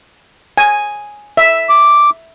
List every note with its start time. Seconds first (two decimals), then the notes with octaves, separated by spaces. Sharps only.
0.58 G#5
1.37 E5
1.70 D6